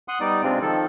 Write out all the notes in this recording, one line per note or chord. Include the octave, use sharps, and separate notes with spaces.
F#5 C6 D#6
G3 B3 D#4 D5
C3 G#3 C4 D4 F4
D#3 F3 A4